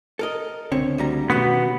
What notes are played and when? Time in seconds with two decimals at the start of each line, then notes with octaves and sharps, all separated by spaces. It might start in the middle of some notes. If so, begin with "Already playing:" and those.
0.19 A4 A#4 D#5
0.72 C#2 D3 C4 C#5
0.98 D2 G3 A#5
1.30 B2 D#3 A3 B3 C#4 F#4 G4